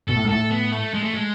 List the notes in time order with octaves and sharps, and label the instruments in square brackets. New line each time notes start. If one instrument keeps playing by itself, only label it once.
[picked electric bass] B2 [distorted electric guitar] A4
[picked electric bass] A2
G#2
[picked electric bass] A2 [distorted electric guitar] A4
[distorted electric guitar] B3
A3
G#3
A3
G#3